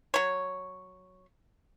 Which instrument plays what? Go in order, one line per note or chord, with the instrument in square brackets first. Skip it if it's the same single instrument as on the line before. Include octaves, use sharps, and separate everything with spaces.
[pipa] F#3 C#5